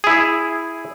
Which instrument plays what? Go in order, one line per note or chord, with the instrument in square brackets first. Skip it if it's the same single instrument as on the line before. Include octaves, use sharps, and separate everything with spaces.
[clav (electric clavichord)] E4 G#4